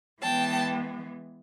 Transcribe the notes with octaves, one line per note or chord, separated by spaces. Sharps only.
E3 G#3 B3 G5 A5